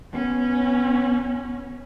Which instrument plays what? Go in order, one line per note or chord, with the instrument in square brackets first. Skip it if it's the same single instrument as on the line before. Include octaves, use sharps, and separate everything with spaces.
[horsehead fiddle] B3 C#4